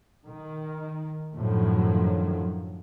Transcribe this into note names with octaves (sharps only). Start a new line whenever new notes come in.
D#3
F#2 A2 D3 D#3 F3 F#3